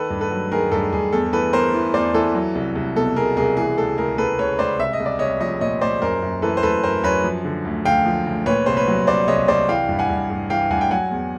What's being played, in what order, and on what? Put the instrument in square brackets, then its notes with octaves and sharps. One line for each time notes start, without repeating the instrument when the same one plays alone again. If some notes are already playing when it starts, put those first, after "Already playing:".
Already playing: [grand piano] D#3 A4 B4
G2
A4 B4
F#3
D#3 G#4 A#4
G2 A4
G2 G#4
E2 A4
E3 A4 B4
E2 A#4 C5
E3
E2 C5 D5
E3 A4
F#3
C2
C2
B2 A4
B2 G#4 A#4
C2 G#4 A#4
E3 G#4
C#2 A4
C#2 G#4 A#4
C#2 A4 B4
C#2 B4 C#5
C#2 C5 D5
C2 E5
D#5
C2
D5
C2 C#5 D#5
F3 C#5 D#5
A#2 C#5 D#5
A#2 C5 D5
F#2 A#4 C5
F#2
E3 A4 B4
C5
F#2 A4 B4
F#2 A#4 C5
F#2 B4 C#5
F3
D3
D2
D3 F5 G5
F3
D2
A#2 B4 C#5
C2 C5
B4 C#5
F#3
C2 C5 D5
C2 C#5 D#5
C2 C5 D5
E3 F5 G5
G2
F#5 G#5
G2
G2
E3 F5 G5
G2 F#5 G#5
G5
F#3 F#5 G#5
E2